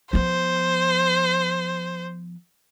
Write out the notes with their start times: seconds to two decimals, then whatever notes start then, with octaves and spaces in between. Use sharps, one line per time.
0.13 F3 B3 C5